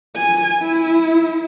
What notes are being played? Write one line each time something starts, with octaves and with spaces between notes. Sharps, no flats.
G#5
E4